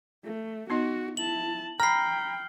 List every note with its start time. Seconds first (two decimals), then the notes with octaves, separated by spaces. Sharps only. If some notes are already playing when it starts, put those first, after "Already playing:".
0.24 A3
0.70 B3 D#4 F#4 D#5
1.17 E4 A5 F#7
1.80 G5 A#5 B5 F6 C7